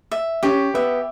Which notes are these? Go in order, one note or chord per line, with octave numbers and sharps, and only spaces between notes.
E5
C#4 G4
B3 E5